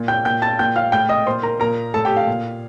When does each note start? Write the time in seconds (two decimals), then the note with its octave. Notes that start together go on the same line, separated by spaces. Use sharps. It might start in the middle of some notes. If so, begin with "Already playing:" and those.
Already playing: A#2
0.08 G5 G6
0.25 A#2 G5 G6
0.42 A5 A6
0.59 A#2 G5 G6
0.76 F5 F6
0.92 A2 G5 G6
1.09 D#5 D#6
1.26 A#2 C5 C6
1.43 A#4 A#5
1.60 A#2 A#4 A#5
1.94 A2 A4 A5
2.05 G4 G5
2.17 F5
2.27 A#2